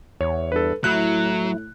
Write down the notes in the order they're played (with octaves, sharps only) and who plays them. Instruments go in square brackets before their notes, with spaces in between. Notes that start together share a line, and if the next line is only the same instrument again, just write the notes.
[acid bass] E2 [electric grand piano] C#5
[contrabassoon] G2 [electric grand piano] A4 B4
[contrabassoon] A2 [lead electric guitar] F#3 [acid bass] E4 [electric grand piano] F#6